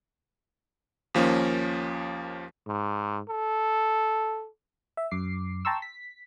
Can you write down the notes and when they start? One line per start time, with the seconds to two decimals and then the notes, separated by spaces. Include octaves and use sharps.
1.14 D#2 F3 A#3 C#4
2.67 G#2
3.28 A4
4.97 E5
5.11 F#2 D6 C7
5.65 G5 A5 A#5 C6 C#6 E6
5.82 B6